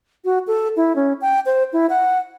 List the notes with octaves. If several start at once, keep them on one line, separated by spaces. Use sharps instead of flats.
F#4
A4
E4
C#4
G5
C5
E4
F#5